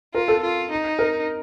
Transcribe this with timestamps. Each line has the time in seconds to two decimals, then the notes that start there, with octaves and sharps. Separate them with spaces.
0.14 F4 A#4
0.28 A4
0.43 F4
0.71 D#4
0.99 A#4